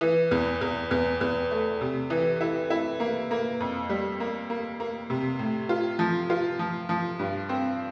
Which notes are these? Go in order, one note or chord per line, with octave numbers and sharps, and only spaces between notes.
E3
E2
E2
E2
E2
A3
C3
E3
E4
E4
A#3
A#3
F2
G3
A#3
A#3
A#3
C3
A2
F4
F3
F4
F3
F3
G2
C4